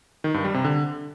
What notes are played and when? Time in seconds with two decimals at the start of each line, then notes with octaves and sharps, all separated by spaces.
0.24 D#3
0.34 G2
0.44 G3
0.54 C3
0.64 D3